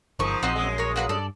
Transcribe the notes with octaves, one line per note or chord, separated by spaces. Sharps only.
G1 G#2 F3 A#4 C#6
A#1 C4 F#4 D#5
F#2 G#3
A#4 C#5
A#3 F#4 B4
G2 A4 D5